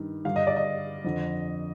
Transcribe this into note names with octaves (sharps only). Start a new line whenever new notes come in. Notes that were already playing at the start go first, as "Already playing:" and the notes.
Already playing: G2 D#3
G2 D3 F5
D#5
D5
D#5
F2 D3